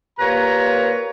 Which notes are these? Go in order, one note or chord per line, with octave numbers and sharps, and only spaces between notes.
A#2 A#3 G4 B4 C#5 A#5